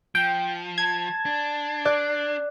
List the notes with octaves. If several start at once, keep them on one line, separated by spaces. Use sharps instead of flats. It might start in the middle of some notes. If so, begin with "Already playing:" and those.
F3 G5
A5 G#6
D4
D5 F#6